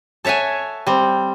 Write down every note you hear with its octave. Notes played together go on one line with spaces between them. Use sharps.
A4 C#5 E5 F#5 G#5
G3 C4